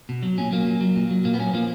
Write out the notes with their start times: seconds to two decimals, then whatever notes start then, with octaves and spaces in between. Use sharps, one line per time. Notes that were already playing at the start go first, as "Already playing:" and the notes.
0.09 B2
0.23 F#3
0.38 A#2 C#4
0.52 F#3 A#3
0.67 A#2
0.81 F#3
0.96 A#2
1.11 F#3
1.24 A#2 A#3
1.34 B3
1.39 F#3 C#4
1.54 F3 A#3